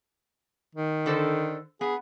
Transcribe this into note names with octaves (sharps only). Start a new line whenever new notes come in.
D#3
D3 A4 C5
B3 G#4